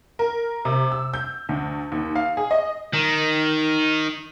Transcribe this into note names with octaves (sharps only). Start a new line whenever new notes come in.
A#4
C3
E6
G6
D2
D#2
F5
G#4
D#5
D#3